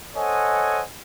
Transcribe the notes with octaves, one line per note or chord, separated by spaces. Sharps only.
A4 C5 C#5 D#5 F#5 G#5